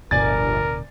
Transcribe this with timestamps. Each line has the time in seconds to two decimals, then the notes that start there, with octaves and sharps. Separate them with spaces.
0.11 D1 G1 B2 D3 A#4 D5 G#5 A6